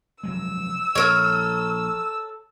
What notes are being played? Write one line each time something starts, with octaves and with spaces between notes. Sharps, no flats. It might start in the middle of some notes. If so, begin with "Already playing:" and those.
F1 F#3 G#3 E6
A#1 A4 A#4 C#5